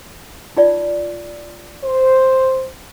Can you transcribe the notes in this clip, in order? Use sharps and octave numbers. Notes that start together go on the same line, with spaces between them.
D#4 F4 D5
C5